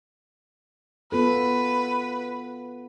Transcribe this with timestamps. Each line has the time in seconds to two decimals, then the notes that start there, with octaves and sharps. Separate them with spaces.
1.12 B3 F4 A4 B4